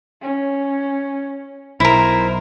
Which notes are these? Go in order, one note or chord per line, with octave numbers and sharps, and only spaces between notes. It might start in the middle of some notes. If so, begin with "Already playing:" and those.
C#4
B1 E4 A#4 C5